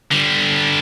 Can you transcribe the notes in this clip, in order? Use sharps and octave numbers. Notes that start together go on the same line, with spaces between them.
D3 G3